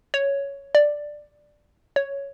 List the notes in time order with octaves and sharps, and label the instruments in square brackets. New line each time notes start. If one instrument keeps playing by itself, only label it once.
[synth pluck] C#5
D5
C#5